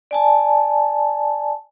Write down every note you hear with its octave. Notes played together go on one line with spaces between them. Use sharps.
D5 G#5 A5